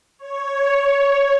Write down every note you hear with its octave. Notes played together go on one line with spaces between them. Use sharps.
C#5